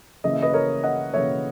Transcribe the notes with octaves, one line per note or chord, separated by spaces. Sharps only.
C#3 E3 A#3 D#5
E5
B4 D#5
A#4 C#5
D#5 F#5
C#3 E3 A#3 C#5 E5